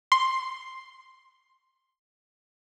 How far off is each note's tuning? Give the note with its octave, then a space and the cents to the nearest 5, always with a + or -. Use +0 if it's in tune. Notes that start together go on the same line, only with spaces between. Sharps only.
C6 +5